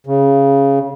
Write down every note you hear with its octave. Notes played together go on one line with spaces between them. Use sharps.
C#3